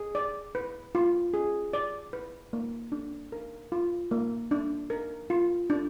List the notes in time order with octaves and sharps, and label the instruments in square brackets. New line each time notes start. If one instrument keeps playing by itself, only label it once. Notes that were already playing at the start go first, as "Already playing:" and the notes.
Already playing: [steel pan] G#4
D5
B4
F4
G#4
D5
B4
A#3
D4
A#4
F4
A#3
D4
A#4
F4
D4